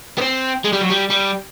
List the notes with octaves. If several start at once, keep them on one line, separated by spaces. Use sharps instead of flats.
B3
C4
G#3
G3
F#3
G3
G3